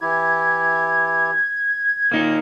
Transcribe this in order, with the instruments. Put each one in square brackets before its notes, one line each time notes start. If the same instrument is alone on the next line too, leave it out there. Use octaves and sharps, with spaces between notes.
[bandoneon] E3 E4 G4 [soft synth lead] G#6
[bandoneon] A#2 D#6 [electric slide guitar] A#3 D#4